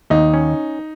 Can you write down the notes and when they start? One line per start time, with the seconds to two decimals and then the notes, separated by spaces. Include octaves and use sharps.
0.10 D#2 D#4
0.34 C#4